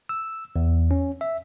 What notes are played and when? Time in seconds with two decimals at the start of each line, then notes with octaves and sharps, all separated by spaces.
0.09 E6
0.56 E2
0.91 C#4
1.21 E5